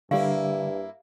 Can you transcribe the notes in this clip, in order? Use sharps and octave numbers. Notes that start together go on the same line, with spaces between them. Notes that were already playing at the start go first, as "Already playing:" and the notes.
G2 D3 G3 A#3 E4 G4 F5